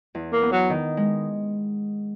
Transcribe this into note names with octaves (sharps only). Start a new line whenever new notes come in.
E2
A#3
B3
F#3
D#3
G#3